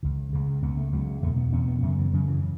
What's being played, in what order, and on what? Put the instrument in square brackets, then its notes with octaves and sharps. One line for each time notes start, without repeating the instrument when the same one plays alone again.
[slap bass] C#2 C#3
C#2 C#3
C#2 C#3 B3
A3
C#2 C#3 F#3
E2 B2 A3
B3
E2 B2 C#4
B3
F#2 C#3 A3
E3
F#2 C#3 F#3
E3